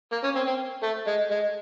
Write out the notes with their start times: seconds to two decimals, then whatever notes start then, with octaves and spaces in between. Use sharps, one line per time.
0.12 A#3
0.23 C#4
0.35 C4
0.47 C4
0.83 A3
1.07 G#3
1.31 G#3